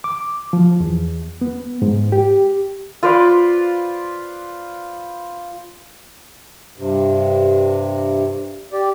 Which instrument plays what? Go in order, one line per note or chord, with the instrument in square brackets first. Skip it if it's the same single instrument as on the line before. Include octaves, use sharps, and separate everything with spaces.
[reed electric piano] D6
F3
E2
B3
G#2
G4
[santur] F4 B4 C5 D5
[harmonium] G2 C3
G4 D5